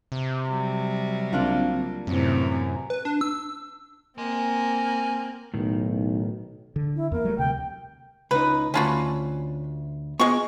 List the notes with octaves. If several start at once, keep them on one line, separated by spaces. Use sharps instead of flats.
C3
F#3 G3
C2 C#3 A#3 C4 D4 F4
F#2 A2 C3 E3 C4
B4
D4
E6
A#3 C4 G#5 C6
B1 A2 D#3
D3
E4
E2 A#3 A#4
F#3 G3 A3
D2 C3 G5
C#2 D#4 B4
D2 C#4 F4 F#4 A5 B5
G#3 B3 F4 F#4 D5 C#6